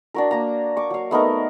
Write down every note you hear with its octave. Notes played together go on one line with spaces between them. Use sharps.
D4 F#4 A#4
A#3 A#5
C#6 D6
F#3 F5
A3 B3 D#4 A#4